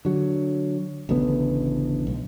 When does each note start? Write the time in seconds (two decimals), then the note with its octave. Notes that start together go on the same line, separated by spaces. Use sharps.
0.05 D3 F#3
1.09 A1 D2 C#3 B3
2.07 B1